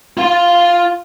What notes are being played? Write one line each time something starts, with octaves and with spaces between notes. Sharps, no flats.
F4 F5